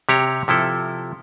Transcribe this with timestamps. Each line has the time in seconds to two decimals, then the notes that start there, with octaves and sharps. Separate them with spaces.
0.09 C3 G4 C#5 A#5
0.48 C3 F3 E4 A4